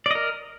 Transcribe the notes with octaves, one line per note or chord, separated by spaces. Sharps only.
A#4 D5 D#5